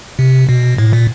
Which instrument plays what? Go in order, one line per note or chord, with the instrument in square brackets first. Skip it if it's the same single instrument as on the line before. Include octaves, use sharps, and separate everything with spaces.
[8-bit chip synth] C3
B2
A2
A#2